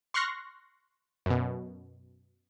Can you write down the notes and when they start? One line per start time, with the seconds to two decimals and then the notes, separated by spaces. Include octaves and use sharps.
0.14 C6 C#6 F6 F#6 A#6 C7
1.26 F#2 B2